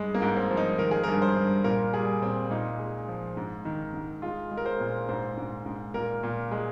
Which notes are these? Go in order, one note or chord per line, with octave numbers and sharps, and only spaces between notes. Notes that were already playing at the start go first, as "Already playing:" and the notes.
Already playing: G2 G#3
A#3
G#2
C4
F3
D#4
D#3 A#4
G#4
A#4
G2
C5
G2
A#2 A#4
G3 G#4
A#2 C4
A#2 D#4
G#3
F3
G#2
D#3
G#2
G#3 F4
G#3
A#4
C5
A#2
G#2 C5
G#2
G#2
A#2 A#4
A#2
G#3